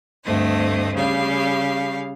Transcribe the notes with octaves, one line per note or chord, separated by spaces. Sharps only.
D2 G2 A3 C4 D#5
C#3 G3 F5